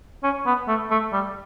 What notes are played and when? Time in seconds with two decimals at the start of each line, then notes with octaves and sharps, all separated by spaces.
0.23 C#4
0.46 B3
0.68 A3
0.91 A3
1.12 G3